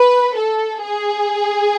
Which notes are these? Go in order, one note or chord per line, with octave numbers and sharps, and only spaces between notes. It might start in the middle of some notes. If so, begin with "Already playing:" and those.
Already playing: B4
A4
G#4